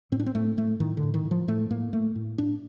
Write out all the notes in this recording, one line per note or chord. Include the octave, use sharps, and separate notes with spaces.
A2 C4
D4
C4
A2 A3
A2 A3
A2 D#3
D3
A2
D#3
A2
F3
A2 A3
A2 A#3
A2 A3
A2
A2 D4